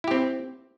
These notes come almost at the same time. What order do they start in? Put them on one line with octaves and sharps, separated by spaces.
E4 G4 C4